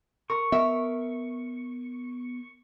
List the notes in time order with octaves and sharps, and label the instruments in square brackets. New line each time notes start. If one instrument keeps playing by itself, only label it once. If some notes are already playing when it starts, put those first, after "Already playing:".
[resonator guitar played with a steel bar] A#4 [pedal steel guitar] C#6
[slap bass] B3 [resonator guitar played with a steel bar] A#4 E5